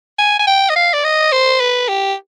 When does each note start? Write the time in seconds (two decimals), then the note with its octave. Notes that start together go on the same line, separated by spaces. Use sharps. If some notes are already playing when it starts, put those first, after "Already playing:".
0.18 G#5
0.39 G#5
0.47 G5
0.69 D#5
0.76 F5
0.93 D5
1.04 D#5
1.32 C5
1.60 B4
1.88 G4